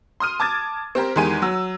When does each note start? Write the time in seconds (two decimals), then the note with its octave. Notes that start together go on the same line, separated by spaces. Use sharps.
0.20 C6 D#6 F6 D#7
0.40 A5 D6 G#6 A6
0.95 C4 G4 A#4 C5
1.16 E2 D#3 G#3 G4 G#5 D#7
1.42 F#3 E6